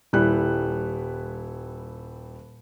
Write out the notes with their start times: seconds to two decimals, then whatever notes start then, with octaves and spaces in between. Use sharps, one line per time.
0.13 D#1 G3 E4 F#6